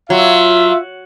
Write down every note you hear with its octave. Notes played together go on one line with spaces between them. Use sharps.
F#3 F4 E5